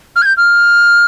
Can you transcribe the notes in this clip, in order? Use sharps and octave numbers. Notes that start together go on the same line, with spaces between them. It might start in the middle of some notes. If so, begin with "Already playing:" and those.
F6
G#6
G6
F6